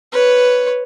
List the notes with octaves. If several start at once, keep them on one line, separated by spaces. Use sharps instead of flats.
B4 C#5